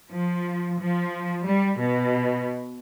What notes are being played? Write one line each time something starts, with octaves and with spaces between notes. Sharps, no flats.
F3
F3
G3
B2